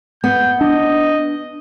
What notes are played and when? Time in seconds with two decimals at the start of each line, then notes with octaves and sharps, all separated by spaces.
0.24 B3 G6
0.61 D4 D#5